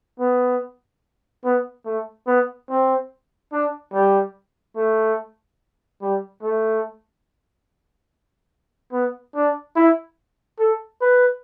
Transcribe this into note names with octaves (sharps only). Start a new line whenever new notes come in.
B3
B3
A3
B3
C4
D4
G3
A3
G3
A3
B3
D4
E4
A4
B4